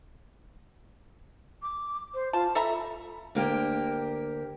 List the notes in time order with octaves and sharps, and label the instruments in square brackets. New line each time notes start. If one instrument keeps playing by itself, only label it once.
[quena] D6
C5
[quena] F4 [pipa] A5
[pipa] A4 E5 A#5 [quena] B5
[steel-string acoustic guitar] D2 A#3 G4